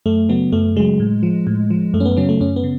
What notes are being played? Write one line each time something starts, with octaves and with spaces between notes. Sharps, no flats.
F#2 A3
C#3 F#3 B3
F#2 A3
C#3 F#3 G#3
A2
F3
A2
F3
F#2 A3
C#4
B3
C#3 F#3 C#4
A3
F#2 C#4
B3
C#3